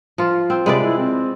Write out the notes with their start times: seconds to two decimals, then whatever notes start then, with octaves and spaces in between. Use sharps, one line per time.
0.18 F3 F4
0.50 C4
0.66 C3 G#3 B4 D5
0.84 E4
0.98 C4